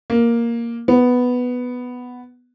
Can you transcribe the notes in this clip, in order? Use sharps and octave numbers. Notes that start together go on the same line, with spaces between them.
A#3
B3